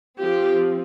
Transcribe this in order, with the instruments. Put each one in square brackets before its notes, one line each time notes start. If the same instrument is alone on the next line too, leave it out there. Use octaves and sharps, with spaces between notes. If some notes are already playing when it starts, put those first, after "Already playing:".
[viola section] F3 C4 G4